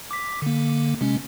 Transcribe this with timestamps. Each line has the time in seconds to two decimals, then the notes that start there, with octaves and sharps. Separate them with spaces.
0.11 D6 B6
0.42 D3 A#3
1.01 C3 G#3 C#4